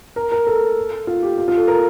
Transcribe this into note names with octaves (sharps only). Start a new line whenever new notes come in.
A#4
A#4
A4
F4
G4
F4
F4
A4
A#4